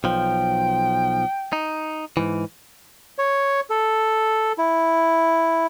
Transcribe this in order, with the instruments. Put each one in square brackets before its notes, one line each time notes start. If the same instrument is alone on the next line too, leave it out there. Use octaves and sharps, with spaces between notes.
[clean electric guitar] B1 F3 [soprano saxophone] G5
[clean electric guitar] D#4
G#2 E3
[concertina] C#5
A4
E4